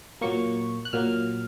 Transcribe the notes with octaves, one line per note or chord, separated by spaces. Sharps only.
A#2 F#3 A#3 C#6
F#6
A#2 F#3 A#3 F6